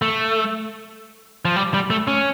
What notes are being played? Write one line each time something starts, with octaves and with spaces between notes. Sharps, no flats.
A3
F3
G3
G3
A3
C#4